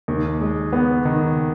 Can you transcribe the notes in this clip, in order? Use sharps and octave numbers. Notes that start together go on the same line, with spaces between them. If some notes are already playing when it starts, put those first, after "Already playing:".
D#2
G#3
B3
D#3